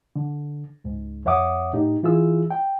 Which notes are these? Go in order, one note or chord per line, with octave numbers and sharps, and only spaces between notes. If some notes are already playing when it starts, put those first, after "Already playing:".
D3
C#2 G#2
F2 C#5 E5 F#5 D6 D#6
A2 D#4 G4
E3 E4 F4 G#4 E6
G5